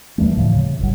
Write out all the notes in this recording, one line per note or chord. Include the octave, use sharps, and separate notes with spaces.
D#2 E3 G3 A3
A2 D3 E3 F3
C#3
D1 G#1 G2 F#3